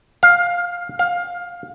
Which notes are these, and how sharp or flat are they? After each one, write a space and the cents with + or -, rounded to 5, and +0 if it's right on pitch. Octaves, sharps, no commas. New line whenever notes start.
F5 +10
F5 +15